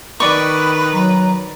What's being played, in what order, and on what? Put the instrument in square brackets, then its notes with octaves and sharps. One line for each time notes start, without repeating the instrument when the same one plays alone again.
[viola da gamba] D#3 B4 [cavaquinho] D5 C#6 [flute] B5
[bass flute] F#3 [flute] A#5